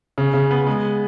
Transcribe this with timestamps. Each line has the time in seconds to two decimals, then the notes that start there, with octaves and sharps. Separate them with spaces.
0.18 C#3
0.34 C#3
0.51 B3
0.67 G#3